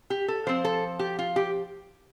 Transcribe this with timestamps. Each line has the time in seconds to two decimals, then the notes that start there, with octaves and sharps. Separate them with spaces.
0.10 G4
0.28 A4
0.47 F3 C4 C5
0.65 A4
0.99 G4
1.19 F4
1.36 G4